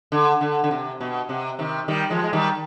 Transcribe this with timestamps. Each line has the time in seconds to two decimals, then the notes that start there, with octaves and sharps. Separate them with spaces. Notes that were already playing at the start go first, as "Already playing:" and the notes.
0.12 D3
0.41 D3
0.64 D3
0.71 C3
1.00 B2
1.29 C3
1.59 C3 D#3
1.88 D#3 G3
2.10 F3 G#3
2.23 G#3
2.33 D#3 G3